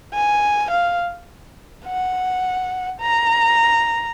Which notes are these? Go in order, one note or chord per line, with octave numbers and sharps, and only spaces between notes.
G#5
F5
F#5
A#5